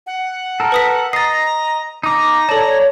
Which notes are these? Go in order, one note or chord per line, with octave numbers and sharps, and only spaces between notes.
F#5
A4 A#4
B4 D#6 B6
D#5 A#5 A6 C7
D#4 A#5 D6
A4 C#5 D5 A5